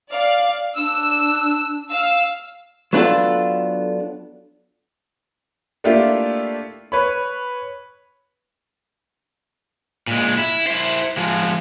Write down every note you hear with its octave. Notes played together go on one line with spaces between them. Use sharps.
D5 F5
D4 E6
F5 E6
F#3 B3 D4 F4 A4
A3 A#3 D4 E4 F4 G4
B4 C#5 B5
A#2 G#3
E4
E4 C5
F3 G#3